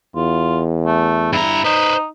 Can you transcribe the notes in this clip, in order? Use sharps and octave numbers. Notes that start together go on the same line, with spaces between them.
E2 F4
A3
G2 E4 A#5
D#4 B4 C5